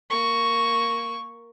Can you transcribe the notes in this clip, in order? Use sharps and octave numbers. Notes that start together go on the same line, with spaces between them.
A#3 C#6